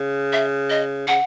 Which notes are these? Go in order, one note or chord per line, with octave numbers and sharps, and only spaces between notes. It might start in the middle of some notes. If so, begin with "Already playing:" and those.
Already playing: C#3
E5
D#5
C#3 F#5